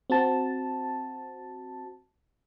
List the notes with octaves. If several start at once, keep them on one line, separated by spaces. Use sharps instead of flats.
C4 F#4 A5